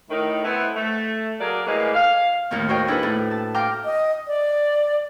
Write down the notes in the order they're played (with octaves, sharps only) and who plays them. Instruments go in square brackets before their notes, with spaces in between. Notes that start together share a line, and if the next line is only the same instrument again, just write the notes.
[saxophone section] A2 D#3
A3 B3 C4 E4
A3
F#3 A#3 G#4 A#4 D5
A2 E3 G#3 A#3
F5
[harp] D#2 A2 D#3 C4
F#4 A#4 C5 C#5 D#5 G5
D4 E4 G#4 A4 B4
A2 A3 E4
A5
F5 G5 A#5 D6
[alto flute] D#5
D5